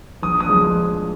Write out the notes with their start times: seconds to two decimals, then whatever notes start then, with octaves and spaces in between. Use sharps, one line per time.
0.23 A#1 D#6
0.40 D#6
0.49 F3 G#3